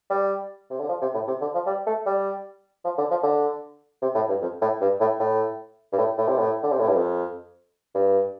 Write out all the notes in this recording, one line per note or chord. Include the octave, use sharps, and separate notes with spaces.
G3
C3
D3
F3
C3
A2
C3
D3
F3
G3
A3
G3
F3
D3
F3
D3
C3
A2
G2
F2
A2
G2
A2
A2
G2
A2
A2
C3
A2
D3
C3
A2
G2
F2
G2